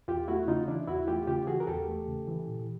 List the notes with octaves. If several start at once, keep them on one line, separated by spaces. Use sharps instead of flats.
E2 F4 G4
A3 E4 F#4
C#3 D#4 F4
E3 D4 E4
E2 E4 F#4
A3 F4 G4
C#3 F4 G4
E3 F#4 G#4
A#4
E2 G4 A4
A3
C#3
E3
A#2